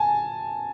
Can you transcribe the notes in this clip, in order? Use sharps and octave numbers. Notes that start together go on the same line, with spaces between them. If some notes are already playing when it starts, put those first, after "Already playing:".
Already playing: G#5 A5